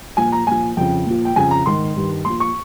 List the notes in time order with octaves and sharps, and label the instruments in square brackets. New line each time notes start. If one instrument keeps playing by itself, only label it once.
[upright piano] A#2 F3 G#5
A#5
A#2 F3 G#5
F2 C#3 F3 G5
A#2 F3
G5
F2 C#3 F3 G#5
A#5
G#2 D#3 C6
G2 D#3
A#2 F3 C6
C#6